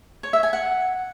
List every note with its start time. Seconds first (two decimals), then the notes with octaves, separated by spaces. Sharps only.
0.23 C#5
0.33 E5
0.43 G#5
0.53 F#5